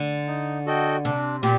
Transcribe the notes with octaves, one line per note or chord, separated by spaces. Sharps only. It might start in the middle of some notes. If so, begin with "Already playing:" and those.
Already playing: D3
D#4
F#4 A4 D#5 G5
C3 D4
A#2 G4